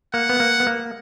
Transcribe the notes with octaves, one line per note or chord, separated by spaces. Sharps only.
A#3 F#5
B3
A#3
B3
A#3